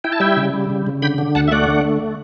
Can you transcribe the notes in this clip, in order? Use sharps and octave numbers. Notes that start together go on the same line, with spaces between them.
E4 G5
A5
G3 E5 G5
C#3
G3
C#3
C#3
D3 G5 B5
D3
D2 F#5 A5
E5
A3 D5 F#5
D3
A3